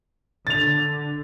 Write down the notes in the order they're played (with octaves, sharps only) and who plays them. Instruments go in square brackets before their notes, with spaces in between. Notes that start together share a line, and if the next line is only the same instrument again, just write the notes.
[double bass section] D3 [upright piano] A6 F7